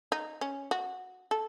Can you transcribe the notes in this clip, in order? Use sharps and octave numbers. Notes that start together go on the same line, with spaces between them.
D#4
C#4
F#4
A4